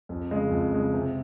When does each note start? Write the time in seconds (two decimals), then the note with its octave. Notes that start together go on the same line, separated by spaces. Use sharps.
0.09 F2
0.31 C#3 G#3
0.51 F2
0.73 C#3 G#3
0.94 C3